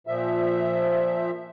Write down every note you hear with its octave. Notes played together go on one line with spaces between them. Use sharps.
A#2 F3 E5